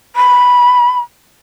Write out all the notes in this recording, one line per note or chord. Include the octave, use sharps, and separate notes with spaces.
B5